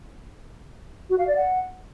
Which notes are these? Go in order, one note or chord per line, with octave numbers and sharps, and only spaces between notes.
F#4
F5
D5
F#5